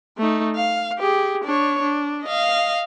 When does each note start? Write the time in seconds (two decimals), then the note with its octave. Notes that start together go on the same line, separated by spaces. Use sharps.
0.18 A3 D#4
0.56 F5
0.99 G4 G#4
1.44 D4 C#5
1.82 D4
2.23 D#5 F5